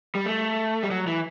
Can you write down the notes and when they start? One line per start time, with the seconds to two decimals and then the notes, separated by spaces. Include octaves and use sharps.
0.15 G3
0.26 A3
0.83 G3
0.91 F#3
1.07 E3